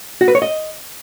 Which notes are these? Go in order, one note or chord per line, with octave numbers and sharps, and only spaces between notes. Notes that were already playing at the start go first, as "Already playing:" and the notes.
F#4
B4
C#5
D#5